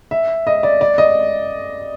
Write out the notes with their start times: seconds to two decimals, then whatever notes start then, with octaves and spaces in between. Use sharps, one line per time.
0.11 E5
0.47 D#5
0.63 D5
0.81 D5
0.98 D#5